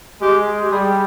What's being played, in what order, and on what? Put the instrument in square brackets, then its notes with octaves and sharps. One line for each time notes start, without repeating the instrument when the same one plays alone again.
[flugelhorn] G#3 [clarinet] G4
[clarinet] G4
[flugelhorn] G3 [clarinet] G#4